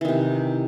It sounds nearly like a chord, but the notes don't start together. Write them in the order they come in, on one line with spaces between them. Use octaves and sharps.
E3 D#3 C3